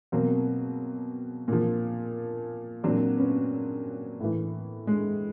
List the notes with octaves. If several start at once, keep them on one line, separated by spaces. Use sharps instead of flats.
B2 F#3 A#3 C4
A#2 F3
A#2 F#3 C4 D4
B3 C#4
A2 E3
G#3